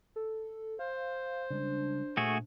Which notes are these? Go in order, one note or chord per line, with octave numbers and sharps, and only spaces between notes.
A4
C5 F5
C#3 G3 G#3 D4
A#2 A3 F#4 G#4